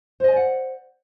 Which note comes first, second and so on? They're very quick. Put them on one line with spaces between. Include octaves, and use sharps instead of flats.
C5 D#5 G#5 D5 F#5